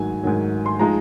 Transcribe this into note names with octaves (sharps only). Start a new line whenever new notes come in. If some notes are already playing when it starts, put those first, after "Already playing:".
Already playing: G#2 D#3 F#3 G#5
G#2 D#3 F#3
C6
F3 G#3 D#4 A#5